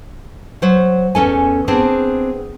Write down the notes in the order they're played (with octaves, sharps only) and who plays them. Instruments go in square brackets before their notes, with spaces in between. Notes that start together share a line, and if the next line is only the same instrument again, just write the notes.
[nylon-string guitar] F#3 C5
E2 C#4 A4 G#5
B3 C4 D4 G#4 C5